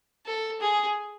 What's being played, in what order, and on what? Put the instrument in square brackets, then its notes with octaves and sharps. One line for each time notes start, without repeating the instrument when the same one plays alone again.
[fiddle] A4
G#4